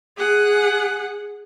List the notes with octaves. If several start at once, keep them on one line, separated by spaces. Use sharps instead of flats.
G#4 F#5